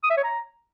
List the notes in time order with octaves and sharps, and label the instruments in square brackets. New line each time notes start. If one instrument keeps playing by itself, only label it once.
[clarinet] D#6
E5
C#5
A#5